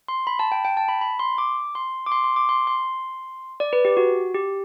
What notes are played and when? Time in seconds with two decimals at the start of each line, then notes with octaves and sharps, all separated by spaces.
0.08 C6
0.27 B5
0.39 A5
0.52 G5
0.65 G5
0.77 A5
0.88 B5
1.01 B5
1.19 C6
1.38 D6
1.75 C6
2.06 D6
2.12 C6
2.24 C6
2.36 D6
2.49 C6
2.67 C6
3.60 D5
3.73 B4
3.85 G4
3.97 F#4
4.34 G4